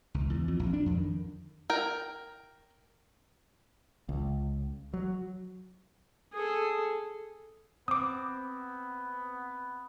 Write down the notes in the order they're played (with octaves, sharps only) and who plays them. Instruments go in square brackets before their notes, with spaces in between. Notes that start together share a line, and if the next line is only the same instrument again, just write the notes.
[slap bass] C#2
E2
F2
A#1
D4
F2
D#3
[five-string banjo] A#4 G5
[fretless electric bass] C#2
F#3
[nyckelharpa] G#4 A4
[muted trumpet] B3 [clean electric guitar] C4 [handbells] D6 D#6